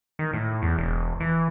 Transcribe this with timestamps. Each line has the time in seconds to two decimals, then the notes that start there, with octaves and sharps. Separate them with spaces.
0.19 D#3
0.33 A2
0.62 E2
0.79 E1
1.20 E3